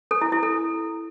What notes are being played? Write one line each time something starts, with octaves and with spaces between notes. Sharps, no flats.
A4
E4
E4
A4